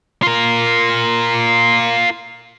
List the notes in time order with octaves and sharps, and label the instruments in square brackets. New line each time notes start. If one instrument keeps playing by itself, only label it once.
[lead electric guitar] F4 A#4